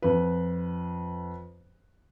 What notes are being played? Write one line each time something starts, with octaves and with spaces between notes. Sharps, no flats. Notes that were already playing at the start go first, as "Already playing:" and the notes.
F2 B4